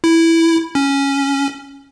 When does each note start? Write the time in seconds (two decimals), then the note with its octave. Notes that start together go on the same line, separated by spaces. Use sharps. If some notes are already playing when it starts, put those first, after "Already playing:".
0.04 E4
0.75 C#4